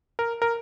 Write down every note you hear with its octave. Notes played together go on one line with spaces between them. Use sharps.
A#4
A#4